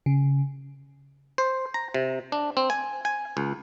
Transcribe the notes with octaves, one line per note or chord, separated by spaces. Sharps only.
C#3
C5
A#5
C3
D4
C4
G#5
G#5
C#2